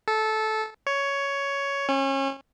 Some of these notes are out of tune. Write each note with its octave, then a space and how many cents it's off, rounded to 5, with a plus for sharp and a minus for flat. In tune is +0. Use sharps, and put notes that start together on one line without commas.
A4 -15
C#5 +10
C#4 -30